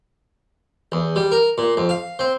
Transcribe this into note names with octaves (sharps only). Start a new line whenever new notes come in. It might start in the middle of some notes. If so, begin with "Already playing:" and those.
E2
G3
A#4
A#2
F2
F5
C4